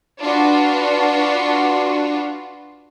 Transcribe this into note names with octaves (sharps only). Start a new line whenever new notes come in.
D4 F4 F#4 B4